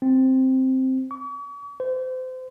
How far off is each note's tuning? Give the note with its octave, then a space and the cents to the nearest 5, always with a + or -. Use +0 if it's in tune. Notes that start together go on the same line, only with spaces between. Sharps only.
C4 +0
C#6 +45
C5 -30